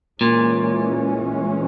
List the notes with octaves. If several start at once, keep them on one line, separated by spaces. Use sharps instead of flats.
A#2 E3 G#3 C#4